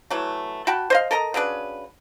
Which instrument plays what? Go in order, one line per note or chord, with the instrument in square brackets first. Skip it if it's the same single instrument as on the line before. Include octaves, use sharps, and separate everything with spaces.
[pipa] E3 F#3 A3
F#4 G5 A5 B5
C5 D#5 F5
A4 A#4 D#5 A#5
C#3 F#3 D4 B4